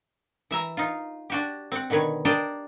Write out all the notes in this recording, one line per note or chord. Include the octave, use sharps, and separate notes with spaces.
E3 E5 A#5
D#4 F4
D4 F#4 G4
C4 F#5
B2 D3 D#3 B4 C#5
D4 G4 A#4 C5 D5 D#5